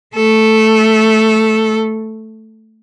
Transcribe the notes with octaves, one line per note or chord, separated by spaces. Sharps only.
A3 A4